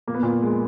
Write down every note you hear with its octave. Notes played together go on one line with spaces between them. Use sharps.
A#2 A#3
B3
A#2 A#3
G#3